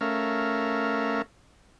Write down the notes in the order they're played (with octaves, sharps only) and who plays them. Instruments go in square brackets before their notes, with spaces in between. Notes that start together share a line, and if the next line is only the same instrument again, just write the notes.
[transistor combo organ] A3 C#4 A#4 E5 F5